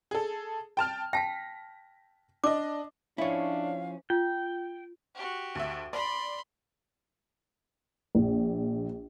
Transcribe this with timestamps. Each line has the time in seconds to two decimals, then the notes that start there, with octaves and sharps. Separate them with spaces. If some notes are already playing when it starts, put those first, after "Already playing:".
0.11 G#4 A4
0.77 G5 A5 F6
1.13 G5 A5 A#6 B6
2.44 D4 D#5 D6
3.18 F3 C#4 D4 E4 C#5 F5
4.10 F4 G5
5.15 F#4 G4
5.55 D2 E5
5.93 D5 B5 C6
8.15 A#1